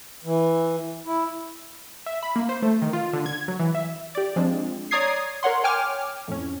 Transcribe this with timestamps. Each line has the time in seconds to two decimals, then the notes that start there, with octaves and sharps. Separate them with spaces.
0.24 E3
1.06 E4
2.06 E5
2.23 B5
2.36 A#3
2.49 C5
2.62 A3
2.82 D#3
2.93 F4
3.13 D3
3.26 G#6
3.48 F#3
3.59 E3
3.75 E5
4.15 G4 D5
4.36 F3 G#3 C4 D4
4.91 C#5 D5 A#5 D#6 G#6 C7
5.43 A#4 C#5 F#5 C6
5.64 C#5 G5 G#5 D6 F6
6.28 F2 A2 C#4